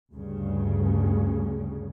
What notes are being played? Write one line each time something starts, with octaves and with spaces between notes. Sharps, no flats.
D2 G2 C#3